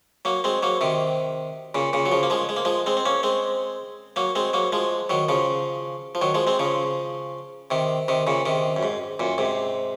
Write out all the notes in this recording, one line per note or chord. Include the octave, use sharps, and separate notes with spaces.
F#3 A#3
G#3 C4
F#3 A#3
C3 D#3
A#2 C#3
A#2 C#3
F#3
C#3 F3
A#3
F3 G#3
G#3
A#3
F3 G#3
G#3 C4
C4
A#3 C#4
G#3 C4
F#3 A#3
G#3 C4
F#3 A#3
F3 G#3
D#3 F#3
C#3 F3
F3
D#3 F#3
F3 G#3
G#3 C4
C#3 F3
C3 D#3
C3 D#3
A#2 C#3
C3 D#3
F#2
G#2
F#2 A#2
G#2 C3